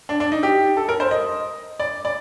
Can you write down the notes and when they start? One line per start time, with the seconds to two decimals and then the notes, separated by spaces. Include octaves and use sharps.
0.09 D4
0.20 D4
0.32 D#4
0.43 G4
0.77 A4
0.89 A#4
1.00 C5
1.11 D#5
1.79 D5
2.05 D5